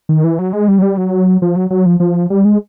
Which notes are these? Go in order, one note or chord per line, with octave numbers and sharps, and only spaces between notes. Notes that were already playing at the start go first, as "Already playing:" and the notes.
D#3
E3
F#3
G#3
G3
F#3
G3
F#3
F3
F#3
F#3
F3
F3
G3
G#3